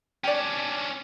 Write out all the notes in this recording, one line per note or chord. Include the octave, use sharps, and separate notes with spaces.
C#4 D4 G4 D5